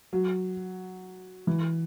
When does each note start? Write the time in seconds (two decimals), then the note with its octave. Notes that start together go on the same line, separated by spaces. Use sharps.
0.13 F#3
1.47 E3